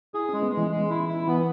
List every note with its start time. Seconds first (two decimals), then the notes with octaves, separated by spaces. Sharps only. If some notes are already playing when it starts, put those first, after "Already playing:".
0.14 E4 G#4
0.29 G#3 C#4
0.42 B3
0.52 G#3
0.57 E3
0.71 G#3
0.90 E4
1.09 E4
1.28 E3 B3